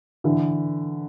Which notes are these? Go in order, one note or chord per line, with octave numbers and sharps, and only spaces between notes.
D3 E3